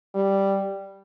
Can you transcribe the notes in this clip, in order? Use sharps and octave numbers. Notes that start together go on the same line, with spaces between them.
G3